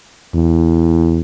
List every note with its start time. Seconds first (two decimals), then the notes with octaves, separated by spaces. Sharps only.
0.34 E2